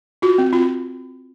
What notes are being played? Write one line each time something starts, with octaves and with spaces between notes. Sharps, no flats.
F4 F#4
C4
F4